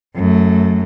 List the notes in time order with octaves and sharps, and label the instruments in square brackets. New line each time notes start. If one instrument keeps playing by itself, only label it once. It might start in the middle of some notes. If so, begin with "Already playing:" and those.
[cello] F#2 A3